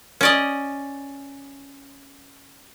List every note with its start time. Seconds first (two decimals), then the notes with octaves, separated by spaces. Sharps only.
0.21 C#4 D5 D#5